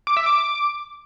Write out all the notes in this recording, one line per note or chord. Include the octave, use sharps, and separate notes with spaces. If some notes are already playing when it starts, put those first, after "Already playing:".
D6
E5
D6